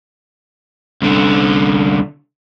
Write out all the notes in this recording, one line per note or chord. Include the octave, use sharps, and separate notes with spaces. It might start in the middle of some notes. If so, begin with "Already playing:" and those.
C2 D3